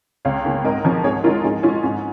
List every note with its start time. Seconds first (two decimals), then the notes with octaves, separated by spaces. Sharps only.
0.25 C#2 C#5 F5
0.44 C#3 A#3 C#4
0.64 G#2 A#4 D#5
0.85 F3 C#4
1.04 G#2 G#4 C#5
1.24 G#3 C#4 F4 A#4
1.44 G#2 D#4 G#4
1.63 C#4 F4
1.66 G#3
1.83 G#2 C#4